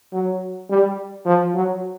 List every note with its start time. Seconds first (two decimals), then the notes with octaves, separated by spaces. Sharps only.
0.13 F#3
0.70 G3
1.26 F3
1.55 F#3